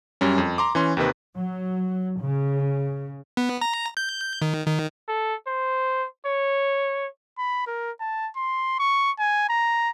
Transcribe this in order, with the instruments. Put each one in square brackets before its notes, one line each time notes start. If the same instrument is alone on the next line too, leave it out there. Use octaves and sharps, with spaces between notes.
[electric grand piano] F#2 G3 C#4
F2
A#5 C6 D6
E3 C#4 C6
D#2 C3 D#3 B4
[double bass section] F#3
C#3
[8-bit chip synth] B3
A#5
G6
D#3
D#3
[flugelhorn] A4
C5
C#5
[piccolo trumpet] B5
A#4
A5
C6
C#6
G#5
A#5